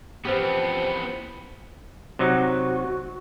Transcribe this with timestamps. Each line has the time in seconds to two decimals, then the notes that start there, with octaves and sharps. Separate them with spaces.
0.25 E3 F3 B3 C4 G4
2.19 C3 F#3 D#4 F#4